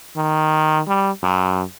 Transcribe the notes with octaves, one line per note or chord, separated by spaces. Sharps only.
D#3
G3
F#2